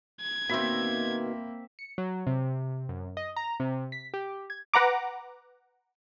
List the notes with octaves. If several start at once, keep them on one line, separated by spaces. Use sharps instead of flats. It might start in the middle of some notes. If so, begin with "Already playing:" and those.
G#6
B2 D#3 A#3 C4 E5 B5
C#7
F#3
C3
F#2
D#5
A#5
C3
B6
G4
G#6
B4 F#5 A#5 D6